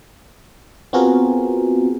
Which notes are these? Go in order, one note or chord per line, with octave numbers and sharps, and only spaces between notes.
B3 C4 F4 F#4 G#4 A#4